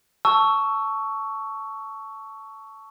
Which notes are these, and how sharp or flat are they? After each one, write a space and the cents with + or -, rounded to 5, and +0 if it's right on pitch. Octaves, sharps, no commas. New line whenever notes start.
A5 +0 C#6 +10 E6 +5